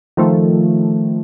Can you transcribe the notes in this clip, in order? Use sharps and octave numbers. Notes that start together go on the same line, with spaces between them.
D#3 F3 A3